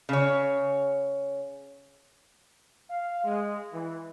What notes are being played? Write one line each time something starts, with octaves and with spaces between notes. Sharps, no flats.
C#3 C#5
F5
G#3
E3